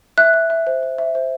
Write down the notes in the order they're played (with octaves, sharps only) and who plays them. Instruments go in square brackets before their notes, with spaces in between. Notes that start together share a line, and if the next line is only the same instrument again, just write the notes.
[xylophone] E5 F#6
E5
E5
C5
C5
E5
C5